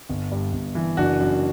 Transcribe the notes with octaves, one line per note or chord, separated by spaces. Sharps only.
G1
G2
G1
E3
F#1 D4 F#4
F#2